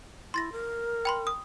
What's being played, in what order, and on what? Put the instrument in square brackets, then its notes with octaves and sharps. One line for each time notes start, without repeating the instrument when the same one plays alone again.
[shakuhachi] E4 [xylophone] C6 A6 A#6
[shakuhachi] A#4
[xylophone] G5 B5 C6
D#6